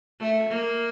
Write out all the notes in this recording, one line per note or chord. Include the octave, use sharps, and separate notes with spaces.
A3
A#3